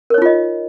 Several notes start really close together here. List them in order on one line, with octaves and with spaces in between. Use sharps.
A#4 C#5 D#4 F4 D#5